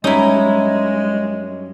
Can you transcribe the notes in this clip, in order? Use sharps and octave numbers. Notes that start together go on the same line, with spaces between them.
F#2 G3 G#3 C#4 D#4 E4